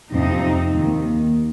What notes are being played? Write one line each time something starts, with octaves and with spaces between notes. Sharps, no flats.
F2 C3 F3 C4 D#4
D#2 D#3